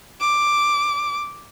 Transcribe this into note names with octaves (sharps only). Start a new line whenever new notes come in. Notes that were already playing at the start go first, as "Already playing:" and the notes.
D6